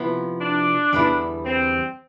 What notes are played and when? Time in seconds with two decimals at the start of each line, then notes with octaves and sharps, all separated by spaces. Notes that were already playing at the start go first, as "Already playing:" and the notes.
Already playing: C3 F3 B3 E4
0.40 D4
0.93 E2 D3 G3 B3 E4
1.45 C4